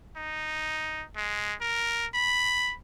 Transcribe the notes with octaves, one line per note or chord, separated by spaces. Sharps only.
D#4
G#3
A#4
B5